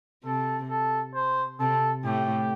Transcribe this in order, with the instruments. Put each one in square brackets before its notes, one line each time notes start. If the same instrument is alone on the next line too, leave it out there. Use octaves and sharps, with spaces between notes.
[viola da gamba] C3 C4 [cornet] A4
[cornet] A4
C5
[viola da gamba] C3 C4 [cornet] A4
[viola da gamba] A2 A3 [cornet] G4